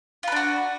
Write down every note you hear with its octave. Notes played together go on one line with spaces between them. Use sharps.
D4 F4 F#4 B4